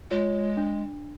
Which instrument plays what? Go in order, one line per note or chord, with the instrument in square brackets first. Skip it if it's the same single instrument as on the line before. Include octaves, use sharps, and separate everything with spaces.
[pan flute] G#3 [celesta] F4 C#5
[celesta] D4